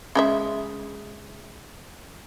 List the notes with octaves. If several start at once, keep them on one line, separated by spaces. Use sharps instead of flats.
C#3 G#3 E5